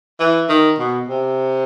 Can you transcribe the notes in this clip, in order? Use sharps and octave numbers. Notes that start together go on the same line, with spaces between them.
E3
D#3
B2
C3